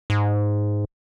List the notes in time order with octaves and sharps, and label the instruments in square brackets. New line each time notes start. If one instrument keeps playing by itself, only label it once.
[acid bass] G#2